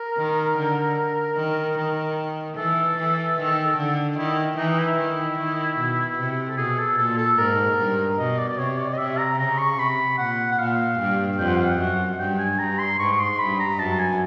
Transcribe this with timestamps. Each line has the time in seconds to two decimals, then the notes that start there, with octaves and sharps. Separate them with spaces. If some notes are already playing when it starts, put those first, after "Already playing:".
Already playing: A#4
0.18 D#3
0.57 D3
1.37 D#3
1.77 D#3
2.57 E3 A4
2.97 E3
3.38 D#3
3.77 D3
4.18 D#3 E4
4.57 E3 D#4
4.78 E4
4.98 D#3
5.38 D#3
5.77 B2
6.18 C3
6.49 A4
6.57 B2 G#4
6.79 A4
6.98 A#2 A4
7.18 A4
7.38 G#2 A#4
7.78 G2
8.18 B2 D#5
8.38 D5
8.49 D5
8.58 C3 C#5
8.78 D5
8.93 D#5
8.98 C3 E5
9.18 A#5
9.38 C#3 A#5
9.58 C#6
9.78 C3 B5
10.18 A#2 F#5
10.52 F#5
10.59 A#2 F5
10.99 G2
11.39 F2 G5
11.48 F#5
11.56 F5
11.66 F#5
11.78 F#2
12.19 G2 G5
12.39 G#5
12.59 G2 A#5
12.79 C6
12.99 G#2 C#6
13.13 C#6
13.20 C6
13.39 G2 B5
13.60 A#5
13.79 F#2 A5
13.99 G#5